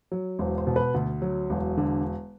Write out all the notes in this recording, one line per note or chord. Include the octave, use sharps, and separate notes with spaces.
F#3
E1 C5
C5
B2
B4
D2
F#3
E1
D3